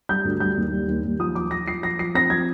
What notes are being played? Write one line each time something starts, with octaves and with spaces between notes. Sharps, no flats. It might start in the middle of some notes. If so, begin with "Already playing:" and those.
G3 G6
D2
G3 G6
D#2
G3
D#2
D#2
F3 D#6
F3 D6
F3 A#6
F3 C7
F3 A#6
F3 C7
C4 A#6
F3 G#6